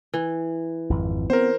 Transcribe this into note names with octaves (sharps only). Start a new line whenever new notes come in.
E3
G#1 F2
B3 C4 A#4 C5